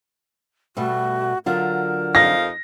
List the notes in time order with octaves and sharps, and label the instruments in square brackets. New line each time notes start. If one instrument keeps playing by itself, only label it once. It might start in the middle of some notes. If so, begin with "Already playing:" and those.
[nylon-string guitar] B2 G3 A3 [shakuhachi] F#4
[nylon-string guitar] D3 F#3 F4 [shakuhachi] A#4
[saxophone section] F2 D#4 F5 [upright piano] A#6